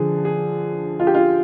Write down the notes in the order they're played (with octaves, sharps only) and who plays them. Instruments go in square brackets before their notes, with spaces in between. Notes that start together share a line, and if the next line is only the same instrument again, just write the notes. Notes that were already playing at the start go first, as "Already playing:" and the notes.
Already playing: [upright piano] D3 F3 G#4
G#4
F4
G4
F4